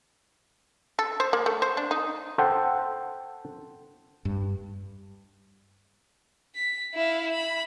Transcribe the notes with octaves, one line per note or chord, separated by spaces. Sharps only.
A4
C5
A#3
A3
C5
D4
D#4
A4 C5 F#5 G5
G2
B6
E4 F5
B5